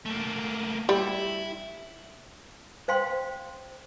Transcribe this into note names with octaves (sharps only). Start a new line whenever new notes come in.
A3 A#3
G3 E4
C5 F5 G5 C6